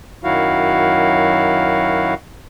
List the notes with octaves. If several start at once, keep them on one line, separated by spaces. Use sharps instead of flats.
F#2 D#3 F#3 E4 F#4 F5